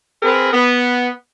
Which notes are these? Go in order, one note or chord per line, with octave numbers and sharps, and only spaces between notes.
C4 G#4 A#4 B4
B3